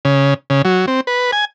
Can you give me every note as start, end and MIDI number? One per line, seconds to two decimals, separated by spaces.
0.05 0.34 49
0.50 0.62 49
0.65 0.86 54
0.87 1.01 60
1.07 1.31 71
1.32 1.45 80